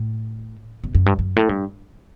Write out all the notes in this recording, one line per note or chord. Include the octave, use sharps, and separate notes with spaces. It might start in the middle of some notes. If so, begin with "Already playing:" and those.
Already playing: A2
B2
F#2
G2
F#2
A2
G2